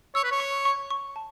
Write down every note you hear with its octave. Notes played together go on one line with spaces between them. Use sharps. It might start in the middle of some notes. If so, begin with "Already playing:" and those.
C#5 E6
B4
C#5
C#6
C#6
C#6
A5